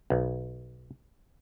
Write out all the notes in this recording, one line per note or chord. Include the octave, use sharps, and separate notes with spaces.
B1